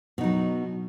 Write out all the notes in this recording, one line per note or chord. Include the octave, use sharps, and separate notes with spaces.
B2 F#3 D#4